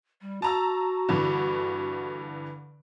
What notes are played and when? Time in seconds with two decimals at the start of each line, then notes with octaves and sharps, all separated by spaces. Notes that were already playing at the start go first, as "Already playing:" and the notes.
0.21 G3
0.42 F#4 A5 A#5 E6
1.09 G2 D3 E3